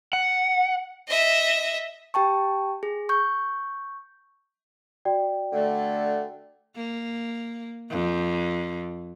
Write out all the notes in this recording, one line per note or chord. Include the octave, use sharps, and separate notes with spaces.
F#5
D#5 E5
G4 G5 A5 C#6
G#4
C#6 G6
F#4 D5 G5
D3 A3
A#3
F2